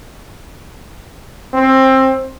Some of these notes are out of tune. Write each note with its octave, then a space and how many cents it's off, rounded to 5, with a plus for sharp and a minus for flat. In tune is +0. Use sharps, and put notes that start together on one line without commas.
C4 +20